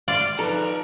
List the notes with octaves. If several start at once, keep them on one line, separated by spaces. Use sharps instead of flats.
D5 F5 C6
F3 D#4 A4 B4 A#5